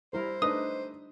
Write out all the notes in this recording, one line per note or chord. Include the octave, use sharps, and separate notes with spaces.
G3 E4 A#4 C5
A3 D4 D#4 B4 D#5 D#6